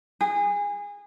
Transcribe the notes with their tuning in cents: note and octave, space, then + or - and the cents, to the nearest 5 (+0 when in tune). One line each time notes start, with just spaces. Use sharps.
G#4 -25